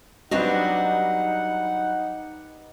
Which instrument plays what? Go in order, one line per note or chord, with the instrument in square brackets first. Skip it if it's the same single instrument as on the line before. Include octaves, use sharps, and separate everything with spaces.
[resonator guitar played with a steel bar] F#3 C4 D4 [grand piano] G3 B4 D#5 [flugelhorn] D#4 [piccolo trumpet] F#5